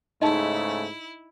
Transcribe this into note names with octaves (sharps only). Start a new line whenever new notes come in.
G#2 C#3 A3 D#4 E4 D#5 A5